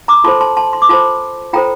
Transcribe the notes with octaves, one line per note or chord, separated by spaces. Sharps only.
A#5 D6
F4 A4 C5 A5 C6
A5 C6
A5 C6
C6
D6
F4 A4 C5 A5 C6
F4 A4 C5 G5 A#5